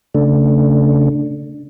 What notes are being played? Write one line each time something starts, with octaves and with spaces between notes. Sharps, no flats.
C#3 A3 D4